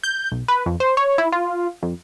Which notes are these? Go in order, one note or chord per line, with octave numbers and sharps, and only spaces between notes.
G6
B1
B4
F2
C5
C#5
E4
F4
F2